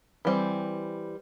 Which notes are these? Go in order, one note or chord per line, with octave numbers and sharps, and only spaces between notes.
E3 G3 C4